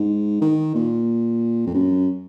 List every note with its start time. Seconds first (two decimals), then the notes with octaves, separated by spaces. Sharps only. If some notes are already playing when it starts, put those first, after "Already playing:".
Already playing: G#2
0.42 D#3
0.75 A#2
1.67 F2
1.74 F#2